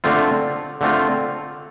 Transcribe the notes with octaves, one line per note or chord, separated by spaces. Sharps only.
D3 A3 C4 F4
D3 A3 C4 F4